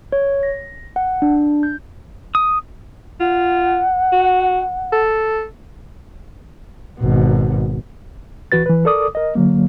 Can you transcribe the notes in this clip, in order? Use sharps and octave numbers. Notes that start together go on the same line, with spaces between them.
C#5
A#6
F#5
D4
G6
D#6
F4 F#5
F#4
A4
G#1 B2
C#2 E3 F#4 B4 A6
E3 B4
A4 A#4 D5 D6 D#6
A#4 D#5
D3 F#3 A#3